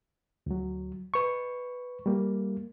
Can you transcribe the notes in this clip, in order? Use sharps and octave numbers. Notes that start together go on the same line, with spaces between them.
D2 F#3
B4 C#6
G3 A#3